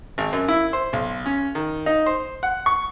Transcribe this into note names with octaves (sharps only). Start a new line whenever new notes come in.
G#1
F#2
E4
C5
B1
C#4
D#3
D#4
C5
F#5
C#6